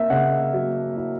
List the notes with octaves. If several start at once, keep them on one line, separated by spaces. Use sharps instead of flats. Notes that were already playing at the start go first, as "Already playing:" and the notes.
Already playing: A#3 E5
C#3 F#5
F#3
E4